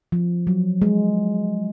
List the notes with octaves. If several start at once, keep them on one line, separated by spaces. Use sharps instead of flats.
F3
F#3
G#3